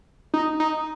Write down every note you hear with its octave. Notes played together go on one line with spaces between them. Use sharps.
D#4
D#4